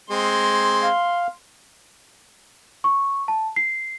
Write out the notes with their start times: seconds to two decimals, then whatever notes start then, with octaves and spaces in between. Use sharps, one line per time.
0.10 G#3 C4 C6
0.83 F5
2.84 C#6
3.28 A5
3.56 C7